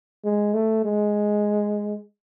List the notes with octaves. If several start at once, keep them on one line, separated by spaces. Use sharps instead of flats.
G#3
A3
G#3